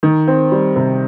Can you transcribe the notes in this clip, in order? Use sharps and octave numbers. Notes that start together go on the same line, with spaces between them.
D#3
C4
G3
C3